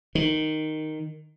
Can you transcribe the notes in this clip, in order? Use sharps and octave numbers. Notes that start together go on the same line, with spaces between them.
D#3